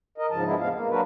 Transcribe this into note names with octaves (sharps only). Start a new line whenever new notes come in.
A#4 D#5
G#2 C#3 F3 A5
F3 G#3 B3 D4 E4
E2 A2 G#3 B3 F5
A#3
F#3 A#3 D4 F#4 A#4 B4